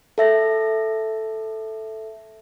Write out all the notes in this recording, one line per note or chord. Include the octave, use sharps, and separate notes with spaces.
A4 E5 A#6